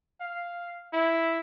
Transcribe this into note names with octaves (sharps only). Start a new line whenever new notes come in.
F5
E4